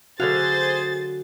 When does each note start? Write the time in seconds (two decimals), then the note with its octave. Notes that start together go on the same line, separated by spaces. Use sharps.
0.20 D3 F#3 F#4 G#4 C5 F5 A6